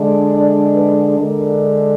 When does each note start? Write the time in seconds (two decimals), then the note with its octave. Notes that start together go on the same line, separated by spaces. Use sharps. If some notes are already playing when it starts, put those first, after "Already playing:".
Already playing: D3 G#3 D4
0.32 D5
0.74 B4
1.17 D3 G#3 D4 A#4